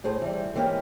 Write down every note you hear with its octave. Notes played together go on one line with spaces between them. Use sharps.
A2 G#4 C5 A5
E3 G3
G#2 E3 A#3 C#4 G4